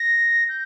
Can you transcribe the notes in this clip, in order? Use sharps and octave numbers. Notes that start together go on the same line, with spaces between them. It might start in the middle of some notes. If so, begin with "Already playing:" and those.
Already playing: A#6
G6